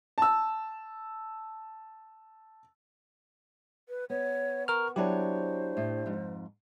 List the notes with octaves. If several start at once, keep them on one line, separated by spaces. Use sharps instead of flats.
A5 E6
B4
B3 C#5
A#4 C#6 F6
F#3 D4 E4 G4 C5 C#5
A2
F2 G#2